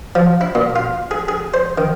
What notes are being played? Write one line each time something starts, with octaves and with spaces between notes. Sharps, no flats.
F3
E4
A#2
F4
G#4
G#4
C5
D#3